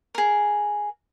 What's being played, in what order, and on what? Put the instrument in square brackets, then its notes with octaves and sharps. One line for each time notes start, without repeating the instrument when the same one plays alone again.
[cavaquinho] G#4 A#4